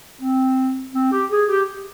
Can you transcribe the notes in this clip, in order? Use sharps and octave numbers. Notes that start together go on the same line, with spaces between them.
C4
C4
G4
G#4
G4